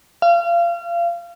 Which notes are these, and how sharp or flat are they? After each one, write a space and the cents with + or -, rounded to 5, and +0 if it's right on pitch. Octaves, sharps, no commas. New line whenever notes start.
F5 -30